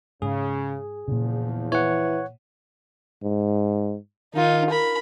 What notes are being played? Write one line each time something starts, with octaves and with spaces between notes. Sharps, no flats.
G#2 C#3 G#4
E2 A#2 C#3 F3
E3 C#5 F#5
G#2
D#3 D#4 F4
A#4 B5